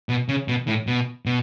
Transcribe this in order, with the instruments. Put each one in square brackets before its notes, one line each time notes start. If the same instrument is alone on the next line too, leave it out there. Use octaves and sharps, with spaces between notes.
[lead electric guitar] B2
C#3
B2
A2
B2
B2